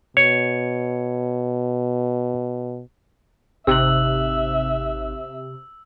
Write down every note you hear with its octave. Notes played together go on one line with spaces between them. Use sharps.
B2 C#5
G#1 C3 D#4 E5 E6 F#6 F#7